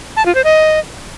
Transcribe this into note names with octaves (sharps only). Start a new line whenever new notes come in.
A5
F4
C5
D#5